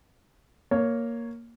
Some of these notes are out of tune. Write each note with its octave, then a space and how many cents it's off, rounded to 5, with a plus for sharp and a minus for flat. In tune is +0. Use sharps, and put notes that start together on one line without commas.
A#3 +0 C#5 +5